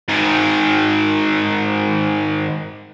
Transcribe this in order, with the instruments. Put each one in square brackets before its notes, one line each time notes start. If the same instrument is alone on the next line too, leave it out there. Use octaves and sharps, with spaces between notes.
[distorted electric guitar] G#2 D#3